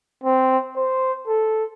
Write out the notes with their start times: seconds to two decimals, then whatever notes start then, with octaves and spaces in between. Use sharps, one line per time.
0.23 C4
0.76 C5
1.27 A4